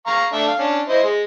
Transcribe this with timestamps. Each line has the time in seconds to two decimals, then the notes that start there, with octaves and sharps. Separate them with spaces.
0.07 F5 A#5 C#6
0.33 A3 D4 E5
0.48 F5
0.59 C#4 D4
0.89 E4 C5 D#5
1.03 G#3